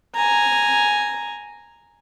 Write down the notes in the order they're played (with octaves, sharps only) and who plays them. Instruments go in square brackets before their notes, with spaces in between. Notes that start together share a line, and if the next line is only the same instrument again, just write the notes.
[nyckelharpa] G#5 A#5